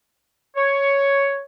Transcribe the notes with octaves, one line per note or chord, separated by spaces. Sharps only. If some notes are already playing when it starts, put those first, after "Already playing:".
C#5